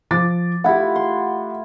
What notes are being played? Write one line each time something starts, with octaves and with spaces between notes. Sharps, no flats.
F3 D6 A6
A3 E4 F4 G4 F#5
C6